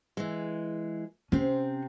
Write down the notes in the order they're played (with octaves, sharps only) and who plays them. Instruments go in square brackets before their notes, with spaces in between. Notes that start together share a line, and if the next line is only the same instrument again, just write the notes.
[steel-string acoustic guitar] E3 G#3
[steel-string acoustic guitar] C3 C4 [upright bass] C#4